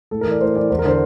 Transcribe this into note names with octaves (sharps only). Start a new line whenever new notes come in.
A2 A4
E3 A#4
D5
A2 C5
E3 D5
E2 C5
A#4
D3 C5